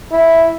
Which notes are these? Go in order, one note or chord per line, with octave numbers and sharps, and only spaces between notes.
E4